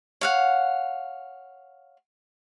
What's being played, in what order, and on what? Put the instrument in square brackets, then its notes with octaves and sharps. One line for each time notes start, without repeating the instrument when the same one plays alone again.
[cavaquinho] C#5 F5 F#5